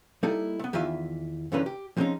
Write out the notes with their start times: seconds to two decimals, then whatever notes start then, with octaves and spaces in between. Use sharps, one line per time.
0.23 G3 A#3 D#4 E4 A4
0.59 A3 B3
0.73 E2 D#3 E3 F4 E5 G#5
1.52 G2 D3 E3 A#3 C#4 B4
1.66 G4
1.97 F3 G3 G#3 C4 C#4 D#4